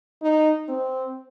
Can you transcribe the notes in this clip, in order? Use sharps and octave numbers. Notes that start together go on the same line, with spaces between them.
D#4
C4